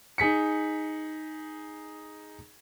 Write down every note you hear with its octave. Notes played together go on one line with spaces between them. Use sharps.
D#4 G#4 B6 C#7